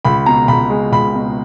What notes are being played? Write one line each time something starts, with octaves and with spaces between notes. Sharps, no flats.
C#2 B5
B2 A#5
C#2 B5
G#3
C#2 B5
B2